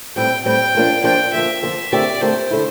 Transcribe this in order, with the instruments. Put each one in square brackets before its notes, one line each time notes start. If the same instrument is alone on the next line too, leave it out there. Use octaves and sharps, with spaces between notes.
[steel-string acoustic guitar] A2 G3 C4 [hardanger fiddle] G5
[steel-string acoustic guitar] A2 G3 C4 [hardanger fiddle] G5
[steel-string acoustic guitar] F3 A#3 D4
[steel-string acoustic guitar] F3 A#3 D4 [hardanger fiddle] G5
[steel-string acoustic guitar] D3 F3 A#3 [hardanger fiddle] E5
[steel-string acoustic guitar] D3 F3 A#3
[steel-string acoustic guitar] D3 A3 C4 G4 A#4 [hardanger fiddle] D5
[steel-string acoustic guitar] D3 A3 C4 G4 A#4 [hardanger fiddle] C5
[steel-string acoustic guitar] D3 A3 E4